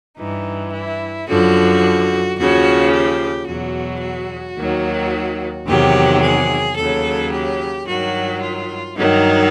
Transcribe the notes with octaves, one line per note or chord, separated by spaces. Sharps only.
G2 E3 D#4
E4
F#2 D3 F3 F#4
D#2 C#3 F3 F#4
G4
E2 B2 F#3 F#4
F#4
D#2 D#3 F#3
E2 C3 D#3 F#3 G4
G#4
D#2 C#3 F#3 A4
G4
G2 D#3 F#3 F#4
F4
G2 D#3 F#3 D#4